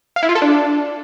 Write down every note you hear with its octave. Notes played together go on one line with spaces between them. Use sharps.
F5
E4
F4
A4
D4